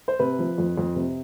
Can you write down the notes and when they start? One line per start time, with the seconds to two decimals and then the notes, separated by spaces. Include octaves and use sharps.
0.08 C5
0.19 C3 B4
0.39 F3
0.58 F2
0.78 F2
0.96 C3